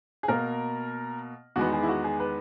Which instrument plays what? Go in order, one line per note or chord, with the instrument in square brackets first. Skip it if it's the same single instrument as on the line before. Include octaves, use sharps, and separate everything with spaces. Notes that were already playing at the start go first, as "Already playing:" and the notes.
[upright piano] G#4
B2 A#3 A#4
E2 D#3 G#3 B3 F#4
G#4
E4
F#4
G#4
B4